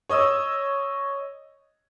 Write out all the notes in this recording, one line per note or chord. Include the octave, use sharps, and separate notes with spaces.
C#5 D#5 D#6 E6